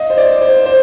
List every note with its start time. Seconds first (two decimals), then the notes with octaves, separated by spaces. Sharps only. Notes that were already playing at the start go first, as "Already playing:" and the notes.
Already playing: D#5 F5
0.10 C5
0.18 D5
0.41 C5
0.66 C5